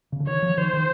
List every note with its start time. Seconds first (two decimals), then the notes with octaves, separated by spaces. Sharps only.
0.12 C#3
0.20 D3
0.27 D#3 C#5
0.42 F3
0.58 D#3 C5
0.73 D#3